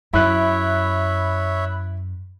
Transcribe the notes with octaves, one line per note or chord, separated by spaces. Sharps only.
F#2 E4 C#5 E5 B5 F#6